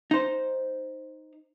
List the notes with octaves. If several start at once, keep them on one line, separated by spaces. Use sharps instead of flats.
D#4 C5